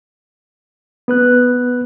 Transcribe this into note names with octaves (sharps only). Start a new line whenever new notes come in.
B3 B4 F#6